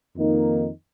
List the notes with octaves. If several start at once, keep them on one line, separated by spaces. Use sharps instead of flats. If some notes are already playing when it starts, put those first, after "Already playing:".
F2 D#3 A#3 D#4